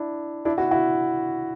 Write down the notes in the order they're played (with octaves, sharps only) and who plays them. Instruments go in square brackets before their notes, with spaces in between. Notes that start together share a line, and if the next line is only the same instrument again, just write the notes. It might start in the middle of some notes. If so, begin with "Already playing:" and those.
Already playing: [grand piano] D4 E4
D4 E4
E4 F#4
E4 F#4